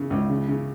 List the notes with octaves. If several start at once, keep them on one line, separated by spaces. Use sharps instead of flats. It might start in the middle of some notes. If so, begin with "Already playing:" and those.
Already playing: C#3
C#2
C#3
C#3